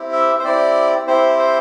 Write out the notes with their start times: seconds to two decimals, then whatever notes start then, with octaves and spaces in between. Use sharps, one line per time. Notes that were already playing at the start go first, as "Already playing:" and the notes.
Already playing: C4 E4 G4
0.13 E5
0.39 C5
0.44 C4 E4 G4 D5
1.07 C4 E4 G4 C5
1.39 C5